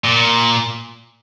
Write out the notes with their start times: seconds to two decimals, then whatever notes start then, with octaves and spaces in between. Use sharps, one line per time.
0.04 A#2